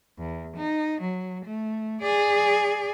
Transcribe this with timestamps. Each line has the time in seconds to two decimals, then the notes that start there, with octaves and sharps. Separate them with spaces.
0.18 E2
0.57 D#4
1.01 F#3
1.45 A3
2.01 G#4 D5